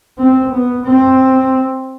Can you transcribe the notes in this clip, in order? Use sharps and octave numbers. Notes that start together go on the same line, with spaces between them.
C4
B3
C4